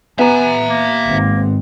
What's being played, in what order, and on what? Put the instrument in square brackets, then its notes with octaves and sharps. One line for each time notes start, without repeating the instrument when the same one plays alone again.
[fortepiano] B3 [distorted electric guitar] E5 A#5 [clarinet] G#5
[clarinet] A#3
[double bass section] G#1 C4